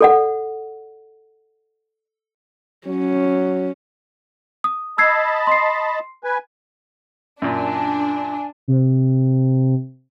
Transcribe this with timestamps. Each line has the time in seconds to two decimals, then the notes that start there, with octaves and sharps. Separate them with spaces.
0.01 A4 D5 F#5
2.87 F#3 C#4
4.64 D#6
4.98 D#5 A5 B5 E6 G#6 C7
5.47 C6 C7
6.24 B4 G#5
7.42 F#2 A#2 D4 G#5
8.68 C3